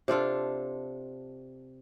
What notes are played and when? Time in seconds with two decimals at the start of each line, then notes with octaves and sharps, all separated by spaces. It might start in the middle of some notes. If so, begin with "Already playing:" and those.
0.08 C3 D4 F4 A4